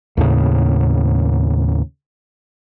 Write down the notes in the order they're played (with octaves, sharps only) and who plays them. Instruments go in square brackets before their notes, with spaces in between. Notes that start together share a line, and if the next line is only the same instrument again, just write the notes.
[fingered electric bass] D#2 A2 C#3